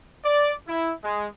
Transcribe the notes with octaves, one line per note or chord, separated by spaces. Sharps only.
D5
E4
G#3